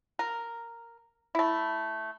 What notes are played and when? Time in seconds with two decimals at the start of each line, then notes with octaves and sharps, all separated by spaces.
0.19 A#4
1.35 A3 E4